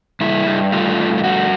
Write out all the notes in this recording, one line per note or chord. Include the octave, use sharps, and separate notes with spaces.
G2 E4
G2
A3 F4
G2
F4
A3 F#4